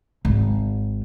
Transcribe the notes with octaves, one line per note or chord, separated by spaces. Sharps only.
G#1